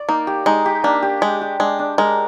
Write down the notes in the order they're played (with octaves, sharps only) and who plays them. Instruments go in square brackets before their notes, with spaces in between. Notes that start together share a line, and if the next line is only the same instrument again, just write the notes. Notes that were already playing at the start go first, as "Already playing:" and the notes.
Already playing: [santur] D5
[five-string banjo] A#3 [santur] D#4
[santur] G4
[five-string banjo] G#3 [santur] D#4
[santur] G4
[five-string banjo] A#3 [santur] D4
[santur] G4
[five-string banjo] G#3 [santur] G4
[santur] G4
[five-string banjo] G#3 [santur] D4
[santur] D4
[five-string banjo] G#3 [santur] A#4